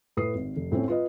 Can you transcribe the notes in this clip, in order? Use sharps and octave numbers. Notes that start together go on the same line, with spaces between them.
A2 B4 D#6 C7
G#1
F1
A2 C4 C#4
F4 B4 D#5